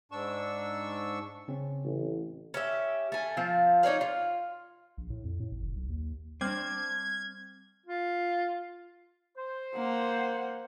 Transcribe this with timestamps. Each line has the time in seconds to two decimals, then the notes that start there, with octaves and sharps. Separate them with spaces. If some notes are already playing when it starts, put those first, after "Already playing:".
0.12 G#2 D4 C#6 E6
1.48 C#3 C4 C#4
1.84 A1
2.54 C#4 G4 E5
3.12 A3 G#5
3.37 F3 C4 F4
3.83 D#4 C#5 D5 F5
4.01 F4
4.98 A#1
5.10 A2
5.24 F2
5.40 A2
5.52 A1
5.63 F1
5.75 B1
5.89 D#2
6.41 G3 C4 D4 F6 G#6
7.86 F4
9.37 C5
9.75 A#3 F#5